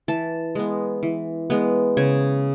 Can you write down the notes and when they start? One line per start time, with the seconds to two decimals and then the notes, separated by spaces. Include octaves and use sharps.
0.08 E3 A5
0.55 G#3 B3
1.03 E3
1.50 G#3 B3
1.97 C#3 G#5